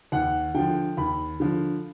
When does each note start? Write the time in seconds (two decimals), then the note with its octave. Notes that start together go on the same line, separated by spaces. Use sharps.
0.12 D#2 F#5
0.55 D3 F3 G5
0.97 D#2 B5
1.40 D3 F3